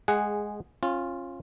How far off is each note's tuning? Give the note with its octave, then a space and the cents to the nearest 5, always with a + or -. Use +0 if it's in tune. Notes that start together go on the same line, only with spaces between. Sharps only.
G#3 +0 G#4 -10 F#5 +0
C#4 -30 F4 +0